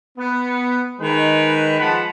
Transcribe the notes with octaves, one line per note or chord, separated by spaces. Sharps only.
B3
D#3 G#3 B4
F3 G#3 B4 F#5 A5 B5